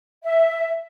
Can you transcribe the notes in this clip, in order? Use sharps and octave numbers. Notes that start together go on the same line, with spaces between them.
E5